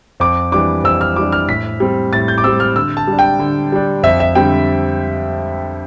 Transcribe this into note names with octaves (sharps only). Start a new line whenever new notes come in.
F2 D6
E3 G3 D4 D6
F2 E6
F6
E3 G3 D4 D6
F6
A2 B6
G3 C4
A2 A6
G6
D6
G3 C4 E6
F6
D3 E6
A5
G3 D4
G5
D3
G3 D4
F2 E5
E5
D3 G3 C4 G5